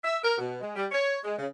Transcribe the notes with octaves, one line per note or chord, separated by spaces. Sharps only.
E5
A#4
B2
G#3
G3
C#5
G#3
C#3